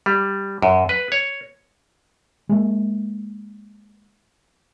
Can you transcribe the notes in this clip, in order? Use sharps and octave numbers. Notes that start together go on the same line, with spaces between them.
G3
F#2
B4
C#5
G#3 A#3